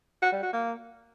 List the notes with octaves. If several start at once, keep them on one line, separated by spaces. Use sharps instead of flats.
F#4
G3
F#4
A#3